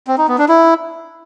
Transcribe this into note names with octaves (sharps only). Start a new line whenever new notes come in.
C4
D#4
B3
D4
E4